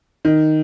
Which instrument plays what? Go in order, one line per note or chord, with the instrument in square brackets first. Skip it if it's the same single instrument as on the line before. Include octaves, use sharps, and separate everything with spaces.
[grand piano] D#3